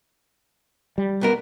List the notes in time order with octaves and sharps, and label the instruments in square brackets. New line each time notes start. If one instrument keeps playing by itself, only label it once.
[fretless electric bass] G3
[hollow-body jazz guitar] B1 B3 A#4